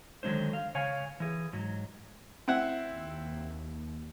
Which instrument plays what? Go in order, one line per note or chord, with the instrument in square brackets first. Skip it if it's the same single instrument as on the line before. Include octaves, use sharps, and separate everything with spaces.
[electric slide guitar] D3 D#3 F#3 G#3 D4 C5
F5
C#3 C#5 F5 G#5
E3 G#4
G#2 F#3
[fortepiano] C4 E4 F#5
[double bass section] D#2